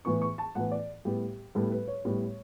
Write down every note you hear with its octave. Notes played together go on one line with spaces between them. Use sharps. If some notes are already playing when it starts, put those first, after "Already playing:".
A2 E3 B3 C#6
C#6
A5
A2 E3 B3 F#5
D5
A2 G3 B3 G4
A2 G3 B3 A4
B4
C#5
A2 G3 B3